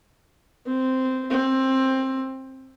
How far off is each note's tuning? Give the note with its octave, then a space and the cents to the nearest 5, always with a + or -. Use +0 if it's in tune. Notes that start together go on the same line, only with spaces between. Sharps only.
C4 -10
C4 +15